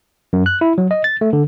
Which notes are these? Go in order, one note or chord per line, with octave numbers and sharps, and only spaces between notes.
F#2
F#6
E4
F#3
D#5
A6
A3
D3